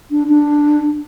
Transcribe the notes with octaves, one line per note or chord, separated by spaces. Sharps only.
D4
D4